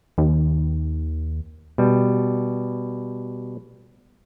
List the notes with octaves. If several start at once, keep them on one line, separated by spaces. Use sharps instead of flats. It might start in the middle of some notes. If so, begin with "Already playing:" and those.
D#2
B2 G3